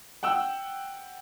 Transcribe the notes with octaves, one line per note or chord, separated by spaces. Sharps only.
F#5 G5 E6